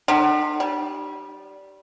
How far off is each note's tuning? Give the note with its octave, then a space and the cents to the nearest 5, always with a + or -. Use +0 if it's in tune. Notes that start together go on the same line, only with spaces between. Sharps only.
D3 +45
G3 -15